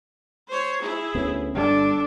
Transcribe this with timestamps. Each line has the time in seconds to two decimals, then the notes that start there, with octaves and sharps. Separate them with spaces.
0.48 C5 C#5
0.81 E4 G#4
1.15 D2 B3 C#4
1.55 G1 G3 D4 A4